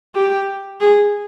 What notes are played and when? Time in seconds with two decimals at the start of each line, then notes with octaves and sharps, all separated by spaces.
0.15 G4
0.80 G#4